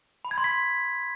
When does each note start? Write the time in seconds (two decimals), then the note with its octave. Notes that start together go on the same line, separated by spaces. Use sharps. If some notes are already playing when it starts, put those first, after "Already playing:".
0.25 B5
0.31 G#6
0.38 C6
0.44 B6